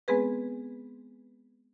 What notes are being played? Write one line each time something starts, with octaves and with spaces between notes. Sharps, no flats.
G#3 B3 C4 G#4 B4